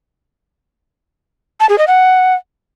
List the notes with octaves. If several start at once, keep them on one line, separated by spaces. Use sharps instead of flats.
A5
G#4
D#5
F#5